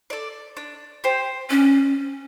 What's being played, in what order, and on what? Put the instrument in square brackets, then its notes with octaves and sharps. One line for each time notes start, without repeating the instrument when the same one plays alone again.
[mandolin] A4 D5
D4
G4 C5
[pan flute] C#4 [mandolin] D4